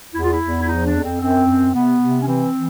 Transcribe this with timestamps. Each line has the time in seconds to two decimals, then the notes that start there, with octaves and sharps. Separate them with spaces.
0.15 E2 E4
0.24 F4
0.32 E4
0.42 E2
0.62 E4
0.68 F3 D#4
0.86 D4
0.95 F2
1.04 C4
1.21 F#2 C4
1.48 F#2
1.74 C3 B3
2.01 C3
2.21 C#4
2.27 E3 C4
2.53 E3